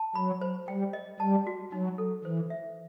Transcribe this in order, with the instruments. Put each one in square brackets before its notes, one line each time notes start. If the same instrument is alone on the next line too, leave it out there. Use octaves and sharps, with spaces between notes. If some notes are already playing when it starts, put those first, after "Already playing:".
Already playing: [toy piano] A5
[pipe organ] F#3 [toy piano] B5
[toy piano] C5
[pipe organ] G3 [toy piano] G5
[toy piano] D#5
[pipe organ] G3 [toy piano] A5
[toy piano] F#4
[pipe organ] F#3 [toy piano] D#4
[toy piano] A4
[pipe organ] E3 [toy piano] C5
[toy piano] E5